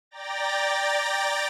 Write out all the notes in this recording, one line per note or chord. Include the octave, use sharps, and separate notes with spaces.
D5 G5 A#5 A6 A#6